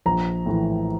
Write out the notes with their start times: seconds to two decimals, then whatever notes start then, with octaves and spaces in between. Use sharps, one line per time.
0.06 A#1 A#5
0.46 A2 E3